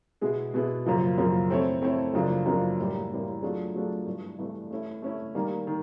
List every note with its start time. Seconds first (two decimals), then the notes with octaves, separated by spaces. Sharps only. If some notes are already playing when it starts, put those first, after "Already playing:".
0.21 B2 G#3 B3 E4 G#4
0.54 B2 G#3 B3 E4 G#4
0.86 F#2 C#3 F3 A#3
1.18 F#2 C#3 F3 A#3
1.50 A3 C4 E4 A4 C#5
1.82 A3 C4 E4 A4 C#5
2.14 F#2 C#3 F3 A#3 D4
2.46 F#2 C#3 F3 A#3 D4
2.78 A2 E3 G3 A#3
3.10 A2 E3 G3 A#3
3.42 F#3 A3 D4 F4 G#4
3.75 F#3 A3 D4 F4 G#4
4.06 G2 E3 A3
4.39 G2 E3 A3
4.71 A3 C#4 E4
5.02 A3 C#4 E4
5.35 D#3 G3 A#3
5.67 D#3